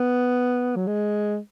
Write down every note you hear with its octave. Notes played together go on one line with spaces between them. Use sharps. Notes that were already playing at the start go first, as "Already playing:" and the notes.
Already playing: B3
F#3
G#3